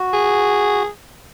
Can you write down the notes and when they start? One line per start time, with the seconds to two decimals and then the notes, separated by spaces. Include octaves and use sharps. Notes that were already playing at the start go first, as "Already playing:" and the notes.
Already playing: F#4
0.13 G#4